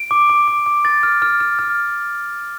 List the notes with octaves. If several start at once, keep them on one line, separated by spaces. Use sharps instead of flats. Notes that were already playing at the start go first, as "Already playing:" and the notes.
Already playing: D7
D6
D6
D6
D6
A6
F6
F6
F6
F6